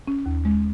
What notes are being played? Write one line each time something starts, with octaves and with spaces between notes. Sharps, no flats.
C#4
D#2
G#3